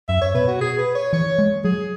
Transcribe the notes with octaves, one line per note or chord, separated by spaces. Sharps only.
F#2 E5
C#5
B2 B4
F#4
G#4
B4
C#5
E3 C#5
G#3
F#3 G#4